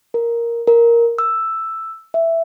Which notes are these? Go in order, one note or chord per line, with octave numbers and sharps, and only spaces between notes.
A#4
A#4
E6
E5